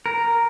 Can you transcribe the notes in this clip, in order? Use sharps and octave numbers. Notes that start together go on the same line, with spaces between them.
A#4